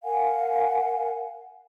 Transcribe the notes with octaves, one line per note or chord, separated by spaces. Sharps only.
A#4 F5 F#5 G#5